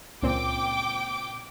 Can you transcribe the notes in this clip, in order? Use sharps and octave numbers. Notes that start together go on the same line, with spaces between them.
C#2 A#2 C4 G5 D6